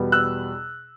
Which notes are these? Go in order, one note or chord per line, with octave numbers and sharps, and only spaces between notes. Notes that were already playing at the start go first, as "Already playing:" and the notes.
Already playing: E2 B2 G3 B3
E6 F#6